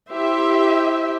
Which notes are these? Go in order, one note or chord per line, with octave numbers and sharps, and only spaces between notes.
E4 G4 C5 E5